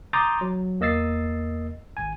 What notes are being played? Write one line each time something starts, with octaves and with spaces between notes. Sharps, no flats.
A#5 C6 D6 D#6 G6 A6
F#3
E2 A#3 D#5 E6 A6 C7
G#1 G#5